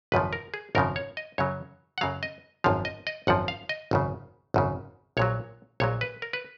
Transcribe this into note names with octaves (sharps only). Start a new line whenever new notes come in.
G#1 F#2 C#3 F3 B4
A#4
G#4
G#1 F#2 C#3 F3 A#4
C#5
D#5
F#2 C#3 F#3 C#5
F#5
F#2 C#3 F#3 F5
D#5
G#1 F#2 F3 F5
D#5
D#5
G#1 F#2 F3 F#5
F5
D#5
G#1 F#2 C#3
G#1 F#2 C#3
A#1 A#2 F#3 C#5
A#1 A#2 F#3 C#5
B4
A#4
B4